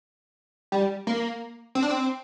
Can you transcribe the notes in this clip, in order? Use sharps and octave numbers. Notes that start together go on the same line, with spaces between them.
G3
A#3
C4
D4
C4